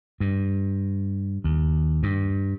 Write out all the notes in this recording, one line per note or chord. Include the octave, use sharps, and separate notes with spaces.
G2
D#2
G2